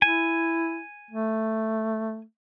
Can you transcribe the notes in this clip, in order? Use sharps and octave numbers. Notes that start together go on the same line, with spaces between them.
E4 G#5
A3